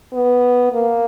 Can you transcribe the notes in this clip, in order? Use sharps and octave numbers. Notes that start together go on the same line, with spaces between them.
B3
A#3